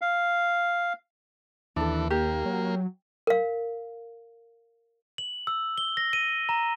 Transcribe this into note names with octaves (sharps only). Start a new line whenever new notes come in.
F5
D#2 E3 D4 A4
A#3 G4
F#3
A#4 F5
F#7
E6
G7
A#6
D#7
A#5